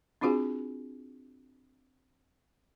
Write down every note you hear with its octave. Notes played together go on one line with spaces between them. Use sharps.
C4 D4 F4 F#4 G#4 G#5